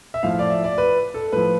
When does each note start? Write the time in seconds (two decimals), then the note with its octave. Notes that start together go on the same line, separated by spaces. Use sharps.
0.14 E5
0.23 A2 F3 F5
0.39 D5
0.50 E5
0.64 D5
0.78 B4
1.14 A4
1.32 A2 F3 B4